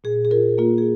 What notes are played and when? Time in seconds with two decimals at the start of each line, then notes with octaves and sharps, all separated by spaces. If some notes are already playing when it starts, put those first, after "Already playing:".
0.04 A#2 G#4
0.25 G#4
0.31 F4 A#4
0.58 A#3 F4
0.78 G#4